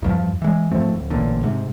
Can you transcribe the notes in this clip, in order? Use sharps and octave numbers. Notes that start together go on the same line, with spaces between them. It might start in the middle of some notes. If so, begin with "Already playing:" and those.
E2 G2 F3
E3 G#3
G#2 F3 A3 C4
D1
A1 A#2 D3
G#2 C3